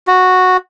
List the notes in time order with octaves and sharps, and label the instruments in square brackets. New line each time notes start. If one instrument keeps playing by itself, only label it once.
[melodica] F#4